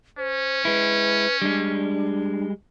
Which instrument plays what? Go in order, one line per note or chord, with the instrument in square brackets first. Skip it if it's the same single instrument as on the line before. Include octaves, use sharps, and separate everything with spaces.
[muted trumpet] C#4 [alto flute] C5
[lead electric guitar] G#3 E4 [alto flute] B4
[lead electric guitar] G3 G#3 [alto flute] D4